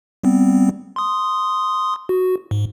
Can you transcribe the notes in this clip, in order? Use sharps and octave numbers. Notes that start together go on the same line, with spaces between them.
G3 B3 C4
C6 D#6
F#4
G#2